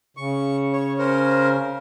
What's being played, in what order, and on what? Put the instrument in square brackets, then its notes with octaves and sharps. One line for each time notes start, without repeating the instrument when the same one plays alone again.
[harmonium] C#3 [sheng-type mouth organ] C#6
[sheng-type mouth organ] C#5
C#4 A#4 C5